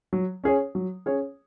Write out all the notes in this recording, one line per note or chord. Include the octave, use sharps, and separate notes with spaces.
F#3
C#4 G#4 C#5
F#3
C#4 G#4 C#5